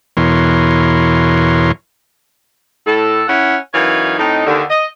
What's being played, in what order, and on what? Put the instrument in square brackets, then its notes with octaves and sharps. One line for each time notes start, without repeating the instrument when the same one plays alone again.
[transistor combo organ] E2 B2 E3 A#4 C#5 C6
[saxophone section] A2 A4
C#4 E4 F#5
F#2 E3 D#4 C#5 F5
A2 C4 D#4
D#2 D3
D#5